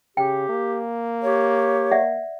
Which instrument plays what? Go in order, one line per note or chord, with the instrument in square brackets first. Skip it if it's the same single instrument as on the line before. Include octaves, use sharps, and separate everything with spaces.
[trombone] C#3 [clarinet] G4 [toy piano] G5
[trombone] A#3
[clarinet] G4 [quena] C#5
[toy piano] D5 E5 F#5